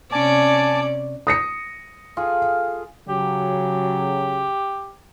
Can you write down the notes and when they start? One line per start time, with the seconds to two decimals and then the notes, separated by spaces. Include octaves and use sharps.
0.12 C3 C#4 D5 G#5 A5 D6
1.27 D#6 A#6 C#7
2.17 F4 G#4 A4
3.08 C#3 F#3 G4